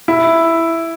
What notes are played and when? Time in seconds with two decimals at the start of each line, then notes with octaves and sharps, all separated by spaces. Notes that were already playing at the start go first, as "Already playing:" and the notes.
0.08 E4